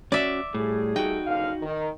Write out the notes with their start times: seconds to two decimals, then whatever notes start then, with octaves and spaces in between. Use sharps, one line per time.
0.12 C#4 F#4 D5 E5
0.54 A2 G3 A3 G#4
0.96 D#4 F#4 G5
1.27 F#1 D3 F5
1.62 D#3